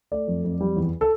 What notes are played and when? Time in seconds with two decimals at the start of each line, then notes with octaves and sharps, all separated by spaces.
0.12 A3 D5
0.28 F2
0.44 F2
0.61 G3
0.77 E2
1.01 A4